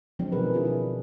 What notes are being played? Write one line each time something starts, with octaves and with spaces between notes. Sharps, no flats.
D3 F3 F#3 G#3 C4 D4
B2 D#3 C4 G#4 A#4 B4
D4 E4 F4 G#4
E4